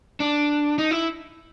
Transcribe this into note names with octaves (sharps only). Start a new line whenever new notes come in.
D4
D#4
E4